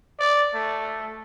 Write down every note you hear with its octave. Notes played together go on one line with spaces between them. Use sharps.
D5
A3